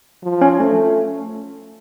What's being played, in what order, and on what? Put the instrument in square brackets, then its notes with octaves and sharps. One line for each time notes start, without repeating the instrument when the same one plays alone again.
[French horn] F3
[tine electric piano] C#4
[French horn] A3 [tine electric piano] C#4